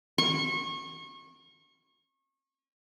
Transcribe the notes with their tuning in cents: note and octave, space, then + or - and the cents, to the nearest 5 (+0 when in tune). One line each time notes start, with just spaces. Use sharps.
C#6 -30